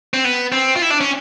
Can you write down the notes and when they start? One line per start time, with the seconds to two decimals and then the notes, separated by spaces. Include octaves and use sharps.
0.14 C4
0.24 B3
0.52 C4
0.76 F4
0.82 E4
0.90 D4
1.01 C#4